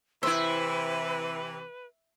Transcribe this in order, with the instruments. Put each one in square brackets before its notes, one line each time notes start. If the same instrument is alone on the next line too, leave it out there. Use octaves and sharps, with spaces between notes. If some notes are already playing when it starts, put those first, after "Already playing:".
[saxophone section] C3 E3 [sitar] E4 C5 [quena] B4 [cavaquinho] E5